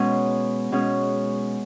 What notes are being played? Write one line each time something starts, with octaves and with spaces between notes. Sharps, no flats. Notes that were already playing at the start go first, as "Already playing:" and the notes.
Already playing: B2 G#3 C#4
B2 G#3 C#4